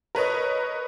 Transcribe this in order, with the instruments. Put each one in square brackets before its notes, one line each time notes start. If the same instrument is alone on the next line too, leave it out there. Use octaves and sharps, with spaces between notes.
[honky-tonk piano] A#4 B4 C#5 D#5